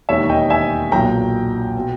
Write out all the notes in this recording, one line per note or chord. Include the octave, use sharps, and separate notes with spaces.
E1 D#2 D#3 C#5 E5
D#5 G5
E5 G#5
B1 A#2 G5 A#5
B2